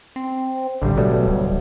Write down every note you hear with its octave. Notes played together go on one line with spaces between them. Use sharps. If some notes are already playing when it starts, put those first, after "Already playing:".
C4
A1 D3 G3
B2 F#3 G3 A3
D1